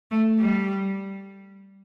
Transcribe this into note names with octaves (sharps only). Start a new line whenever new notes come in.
A3
G3